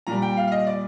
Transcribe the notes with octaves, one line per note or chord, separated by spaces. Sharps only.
A#2 G3 A#5
G5
F5
F5
D#5
D5